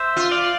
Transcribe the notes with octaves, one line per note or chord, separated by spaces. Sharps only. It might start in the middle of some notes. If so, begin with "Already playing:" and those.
Already playing: C5 E5
F4
D5 F5